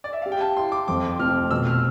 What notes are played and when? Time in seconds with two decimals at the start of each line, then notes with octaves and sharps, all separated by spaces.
0.04 D5
0.13 E5
0.22 G4 F5
0.32 G5
0.41 A5
0.57 E4 C6
0.72 D6
0.88 F2 D6
1.20 F1 F6
1.51 B2 E6
1.67 F6